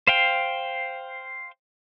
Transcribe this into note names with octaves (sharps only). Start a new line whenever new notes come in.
C5 F5 G5